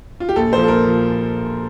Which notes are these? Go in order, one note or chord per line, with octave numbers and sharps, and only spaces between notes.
F4
G4
A#1 A4
A#2 F3 C5
A4
A#1 A#4
A#2 F3